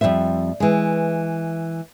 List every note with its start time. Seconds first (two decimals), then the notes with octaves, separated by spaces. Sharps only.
0.01 F2 C#3 G3 C5 E5
0.60 E3 G#3